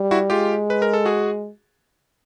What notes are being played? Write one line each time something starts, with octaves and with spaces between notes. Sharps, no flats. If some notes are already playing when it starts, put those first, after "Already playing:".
Already playing: G3
E4 F#4
G#3 F4 G4
B4
A#4
A4
F#4 G#4